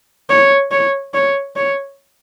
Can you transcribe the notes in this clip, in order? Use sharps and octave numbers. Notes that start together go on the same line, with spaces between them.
C#5
C#5
C#5
C#5